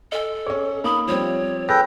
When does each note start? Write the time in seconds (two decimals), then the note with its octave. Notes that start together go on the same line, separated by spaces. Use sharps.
0.12 A4 D#5 G#5
0.46 C#4 G#4 C#5
0.84 A#3 D#4 B5 D#6
1.08 F3 G3 C4 C#5
1.69 G#4 A4 B4 G5 A#6